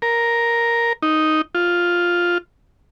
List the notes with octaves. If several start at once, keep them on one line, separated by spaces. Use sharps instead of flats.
A#4
D#4
F4